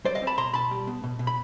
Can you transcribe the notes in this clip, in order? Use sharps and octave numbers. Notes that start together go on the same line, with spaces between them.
G3 C5 D5
D#5 F5
C4
A5 B5
B2 A#5 C6
B2 A5 B5
G3
B3
B2
B2
B5